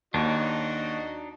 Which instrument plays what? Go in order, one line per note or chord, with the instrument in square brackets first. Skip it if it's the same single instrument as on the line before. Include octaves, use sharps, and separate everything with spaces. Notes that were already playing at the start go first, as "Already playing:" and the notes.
[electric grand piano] D#2 [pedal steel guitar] D4 D#4 C#5 [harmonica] F#4 D#5